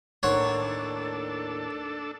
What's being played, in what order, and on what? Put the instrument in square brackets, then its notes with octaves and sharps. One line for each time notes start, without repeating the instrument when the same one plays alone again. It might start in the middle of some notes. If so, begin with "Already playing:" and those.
[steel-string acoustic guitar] D#2 A2 D#3 [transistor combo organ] D4 A4 [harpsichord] C5 C#5 F#5